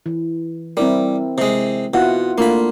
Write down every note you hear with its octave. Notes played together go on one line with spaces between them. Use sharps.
E3
G3 C4 E4 A#4
C3 G#3
B2 E4 F4 F#5
A3 A#3 D4 F4 B5